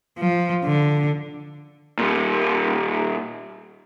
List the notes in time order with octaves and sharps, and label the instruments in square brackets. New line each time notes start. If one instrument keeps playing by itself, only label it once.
[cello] F3
D3
[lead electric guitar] A#2 G3